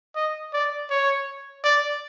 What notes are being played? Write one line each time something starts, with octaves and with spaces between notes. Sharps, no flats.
D#5
D5
C#5
D5